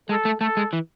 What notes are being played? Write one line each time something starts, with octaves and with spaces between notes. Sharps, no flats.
G#3 A4
A3
A3 A4
G#3
E3